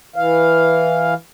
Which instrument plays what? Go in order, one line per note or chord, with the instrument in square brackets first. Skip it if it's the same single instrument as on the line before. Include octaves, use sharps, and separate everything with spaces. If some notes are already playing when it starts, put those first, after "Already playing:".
[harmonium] E3 F5